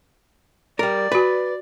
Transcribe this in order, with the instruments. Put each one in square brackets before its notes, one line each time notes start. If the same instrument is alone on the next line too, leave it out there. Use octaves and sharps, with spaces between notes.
[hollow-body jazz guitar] G3 A#4 [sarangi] D5
[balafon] F#4 B5 [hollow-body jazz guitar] B4